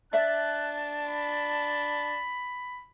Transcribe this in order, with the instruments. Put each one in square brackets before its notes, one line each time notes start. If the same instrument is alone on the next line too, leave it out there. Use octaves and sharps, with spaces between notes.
[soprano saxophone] D4 [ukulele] D5 E5 [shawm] A5 [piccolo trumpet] F#6
[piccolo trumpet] B5